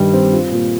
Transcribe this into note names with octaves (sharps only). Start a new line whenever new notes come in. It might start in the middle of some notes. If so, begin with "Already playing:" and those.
Already playing: G2 D#3 G3
C4
F4
A#2